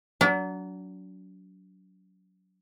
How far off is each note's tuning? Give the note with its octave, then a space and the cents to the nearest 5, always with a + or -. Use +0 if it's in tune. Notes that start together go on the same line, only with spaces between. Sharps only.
F#3 +5 D4 -40